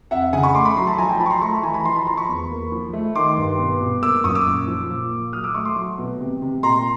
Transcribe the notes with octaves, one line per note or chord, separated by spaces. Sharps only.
F2 E5 F#5
C#3 F#5 G#5
B5 C#6
A3 C6 D6
B5 C#6
F#3 A#5 C6
A5 B5
F3 G#5 A#5
G5 A5
F3 A5 B5
C#6
A#5 C6
A3 B5 C#6
A5 B5
E3 G#5 A#5
A5 B5
F3 A#5 C6
A5 B5
F3 A#5 C6
B5 C#6
E2
A#3
F3
A3
D#3 C6 D6
G2
B2
B2
A#3 D6 E6
F#2 C#6 D#6
D6 E6
A#2
F3
A#2
A#2
F#3 D#6 F6
D6 E6
A3 C#6 D#6
C6 D6
F#3
B2
C3
C3
A#2 A#5 C6